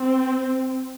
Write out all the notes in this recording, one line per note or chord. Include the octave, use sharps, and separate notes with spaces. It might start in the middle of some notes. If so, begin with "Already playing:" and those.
Already playing: C4